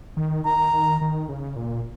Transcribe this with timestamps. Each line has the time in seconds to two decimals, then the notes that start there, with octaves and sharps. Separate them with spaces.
0.17 D#3
0.45 D#3 A#5
0.73 D#3
1.01 D#3
1.29 C#3
1.56 A#2